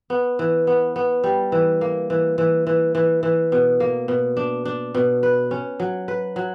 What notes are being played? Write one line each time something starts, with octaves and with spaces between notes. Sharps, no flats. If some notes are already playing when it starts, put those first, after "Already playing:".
B3
E3
B3
B3
G3
E3
A#3
E3
E3
E3
E3
E3
B2
A#3
B2
D4
D4
B2
B4
C#4
F#3
B4
F#3